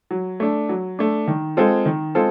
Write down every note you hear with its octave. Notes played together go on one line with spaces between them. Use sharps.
F#3
A3 D4
F#3
A3 D4
D#3
G#3 C4 F4 A4
D#3
G#3 C4 F4 A4